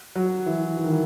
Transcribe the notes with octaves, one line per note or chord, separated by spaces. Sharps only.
F#3
E3
E3
D#3
E3